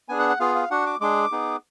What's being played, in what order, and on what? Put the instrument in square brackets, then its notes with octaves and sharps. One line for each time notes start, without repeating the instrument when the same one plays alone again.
[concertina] B3 D4 G#4 G#5
F#5
F#5
B3 F4 G#4 F5
F5
D4 F#4 F#5
D6
G#3 D4 G#4 D6
B3 D#4 G#4